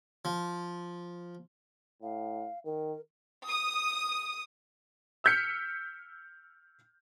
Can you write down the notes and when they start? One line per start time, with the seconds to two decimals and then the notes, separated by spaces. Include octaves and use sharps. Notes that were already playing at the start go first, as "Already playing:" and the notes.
0.25 F3
2.02 A2 F5
2.65 D#3 A#4
3.45 D#6
5.24 E6 F6 G6 B6 C#7